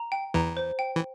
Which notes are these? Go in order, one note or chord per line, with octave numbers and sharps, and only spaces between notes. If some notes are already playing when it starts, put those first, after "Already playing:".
Already playing: A#5
G5
E2 E3 A#5
C5
G5
E3